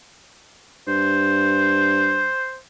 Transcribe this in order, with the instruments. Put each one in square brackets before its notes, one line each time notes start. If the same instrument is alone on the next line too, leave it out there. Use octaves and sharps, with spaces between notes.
[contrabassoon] G2 [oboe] C5